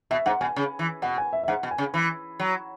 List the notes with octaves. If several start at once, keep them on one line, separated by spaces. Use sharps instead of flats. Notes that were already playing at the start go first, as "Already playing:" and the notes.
B2 E5
G#2 F#5
B2 G#5
C#3
E3
B2 F#5
G#5
E5
E5
G#2 F#5
B2
G#5
C#3
E3 B5
F#3